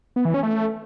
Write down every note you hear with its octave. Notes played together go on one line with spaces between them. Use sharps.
B3
E3
C#4
A3